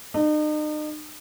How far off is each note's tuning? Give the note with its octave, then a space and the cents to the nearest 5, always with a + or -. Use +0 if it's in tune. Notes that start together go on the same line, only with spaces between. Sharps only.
D#4 -40